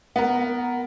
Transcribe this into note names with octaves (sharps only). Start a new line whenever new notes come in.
B3 A#4